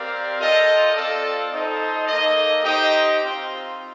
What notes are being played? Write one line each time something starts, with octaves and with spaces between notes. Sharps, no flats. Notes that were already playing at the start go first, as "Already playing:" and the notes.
Already playing: C4 G4 A#4 D5 F5
F4 A4 D#5 G5
C4 F4 A4 D5 F5
D#4 A4 C5 D#5
A#3 D#4 A4 D#5
D#4 G4 C5 D#5 G5
C4 F4 C5